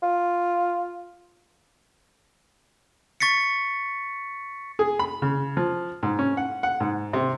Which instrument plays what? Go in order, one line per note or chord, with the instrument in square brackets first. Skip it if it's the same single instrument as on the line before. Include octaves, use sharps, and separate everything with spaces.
[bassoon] F4
[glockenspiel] C#6 A6 B6 C#7
[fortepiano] G#4
B5
C#3
F3
G#2
C#4
F#5
F#5
G#2
C3